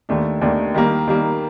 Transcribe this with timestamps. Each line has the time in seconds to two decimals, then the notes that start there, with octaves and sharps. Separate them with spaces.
0.09 D#2 D#3 A3 D4
0.42 D#2 D#3 A3 D4
0.75 D#3 G3 A#3
1.08 D#3 G3 A#3